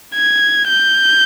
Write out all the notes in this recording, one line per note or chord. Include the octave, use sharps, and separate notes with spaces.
G#6
G6